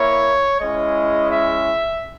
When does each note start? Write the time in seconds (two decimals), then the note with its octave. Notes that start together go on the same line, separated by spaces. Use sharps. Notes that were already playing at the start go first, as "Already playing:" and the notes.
Already playing: A#3 E4 C#5
0.60 G#3 C#4 E4 D#5
1.30 E5